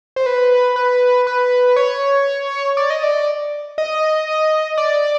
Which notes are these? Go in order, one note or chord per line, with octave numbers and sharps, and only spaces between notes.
C5
B4
B4
B4
C#5
D5
D#5
D5
D#5
D5